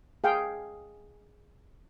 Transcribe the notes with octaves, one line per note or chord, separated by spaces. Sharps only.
G#4 F5 G5